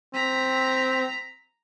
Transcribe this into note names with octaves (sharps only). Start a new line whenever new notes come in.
C4 A#5 B6